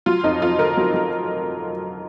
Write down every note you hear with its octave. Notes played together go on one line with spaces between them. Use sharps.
F#3 F4
F2 D#4
F2 F4
D3 A#4
F#3
F#3